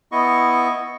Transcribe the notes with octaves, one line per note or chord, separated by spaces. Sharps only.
B3 E4 D#5 C#6